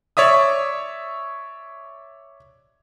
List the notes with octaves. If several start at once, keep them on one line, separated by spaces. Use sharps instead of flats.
C#5 D5 E5 D#6